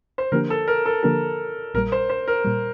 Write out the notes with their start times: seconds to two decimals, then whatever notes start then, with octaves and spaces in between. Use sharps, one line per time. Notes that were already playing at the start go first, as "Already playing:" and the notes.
0.18 C5
0.32 D3 F3 A#3 D4 G4 A#4
0.50 A4
0.68 A#4
0.86 A4
1.03 D3 F3 A#3 D4 G4 A#4
1.74 A#1 A#2 G3 A#4
1.92 C5
2.09 C5
2.28 A#4
2.45 A#2 G3